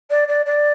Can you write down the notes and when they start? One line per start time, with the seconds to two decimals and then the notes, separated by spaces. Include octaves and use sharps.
0.10 D5
0.28 D5
0.46 D5